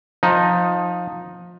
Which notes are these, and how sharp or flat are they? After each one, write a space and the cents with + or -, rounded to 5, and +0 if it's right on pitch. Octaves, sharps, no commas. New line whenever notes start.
F3 +20 D#4 +0